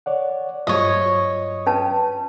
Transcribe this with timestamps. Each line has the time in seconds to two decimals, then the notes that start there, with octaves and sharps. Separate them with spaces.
0.06 C#5 D5 F#5
0.67 G2 F#3 F4 C5 C#5 D#5
1.66 C#4 B4 A5